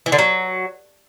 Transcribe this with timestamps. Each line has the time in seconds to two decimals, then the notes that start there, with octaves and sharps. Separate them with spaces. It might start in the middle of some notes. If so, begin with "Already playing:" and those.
0.06 E3
0.12 D3
0.19 F#3